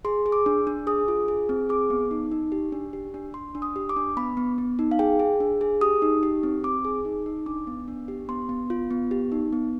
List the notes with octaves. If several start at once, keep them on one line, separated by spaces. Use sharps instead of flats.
G#4 C6
G#4
D6
D4
D4
G#4 D#6
F4
G#4
C4
G#4 D6
B3
D#4
D#4
G4
D4
G4
D4
D4 C6
D4
D#6
G4
D6
D4
B3 B5
B3
B3
D#4
F5
G#4 G5
G#4
D4
G#4
G4 D#6
D#4
G4
C4
C4 D6
G#4
D#4
D#4
D4 D6
B3
D4
G4
B3 C6
B3
F4
B3
G4
D#4
B3